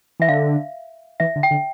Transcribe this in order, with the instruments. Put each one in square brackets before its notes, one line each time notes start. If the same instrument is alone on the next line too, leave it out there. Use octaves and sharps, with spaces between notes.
[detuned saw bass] E3 [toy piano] E5
[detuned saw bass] D3 [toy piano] F5
[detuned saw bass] E3 [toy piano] E5
[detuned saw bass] D3
[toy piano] G5
[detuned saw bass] D3